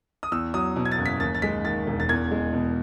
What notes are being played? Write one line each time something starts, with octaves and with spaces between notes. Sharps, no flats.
D#6
E2 E6
F#3 D#6
B2
G#6
A6
F#1
B6
D#2 A6
A6
G#3 B6
D#3 A6
E1
A6
E2 G#6
G#3
B2